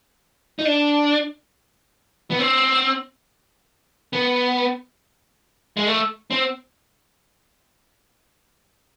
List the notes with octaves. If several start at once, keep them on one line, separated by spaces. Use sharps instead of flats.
D#4
D4
B3
C4
B3
G#3
A3
C4